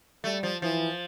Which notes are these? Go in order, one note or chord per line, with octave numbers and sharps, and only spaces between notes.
G3 A3
F3
E3 F3